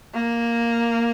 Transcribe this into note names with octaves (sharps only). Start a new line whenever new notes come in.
A#3